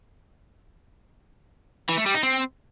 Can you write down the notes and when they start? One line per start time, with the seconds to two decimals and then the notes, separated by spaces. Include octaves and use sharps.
1.89 E3
1.98 A3
2.06 G3
2.15 D#4
2.23 C4